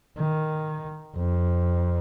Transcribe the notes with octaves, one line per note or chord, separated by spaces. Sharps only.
D#3
F2